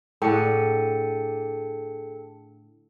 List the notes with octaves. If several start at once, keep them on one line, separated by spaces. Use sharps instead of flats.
A2 D3 G#4 A4 G5 A5 C#7